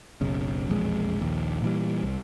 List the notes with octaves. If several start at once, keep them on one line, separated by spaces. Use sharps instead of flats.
F#1 B1 C#3
E1 A#1 F2 G#3
A#1 D#2
A#2 E3 G3
C2